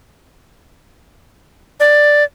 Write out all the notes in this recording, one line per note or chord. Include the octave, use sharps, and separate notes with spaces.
D5